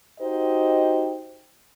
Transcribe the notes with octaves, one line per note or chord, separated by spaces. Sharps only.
D#4 F#4 G4 C5 D#5